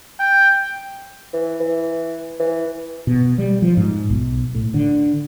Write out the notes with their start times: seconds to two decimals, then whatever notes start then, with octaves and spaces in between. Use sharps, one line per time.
0.19 G5
1.33 E3
1.60 E3
2.40 E3
3.07 B2
3.38 G3
3.62 F3
3.77 G#2
4.10 B1
4.55 A2
4.74 D3